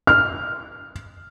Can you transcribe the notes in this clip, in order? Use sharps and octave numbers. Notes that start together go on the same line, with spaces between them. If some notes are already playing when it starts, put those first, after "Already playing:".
F6